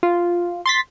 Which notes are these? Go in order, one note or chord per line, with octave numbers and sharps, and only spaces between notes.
F4
C6 A6 B6